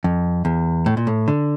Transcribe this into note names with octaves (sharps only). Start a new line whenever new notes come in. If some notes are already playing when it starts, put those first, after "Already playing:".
F2
E2
A2
A#2
A2
D3